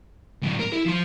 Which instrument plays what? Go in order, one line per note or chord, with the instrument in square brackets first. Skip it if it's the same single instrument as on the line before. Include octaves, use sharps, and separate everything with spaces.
[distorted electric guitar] A2 F#3
A#4
E4
F3 C6